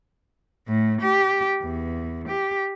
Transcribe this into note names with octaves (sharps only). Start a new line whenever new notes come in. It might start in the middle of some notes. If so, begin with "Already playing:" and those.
A2
G4
E2
G4